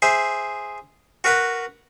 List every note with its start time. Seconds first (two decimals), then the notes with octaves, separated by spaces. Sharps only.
0.02 G#4 C5 E5
1.24 F#4 A#4 B4 F#5 B5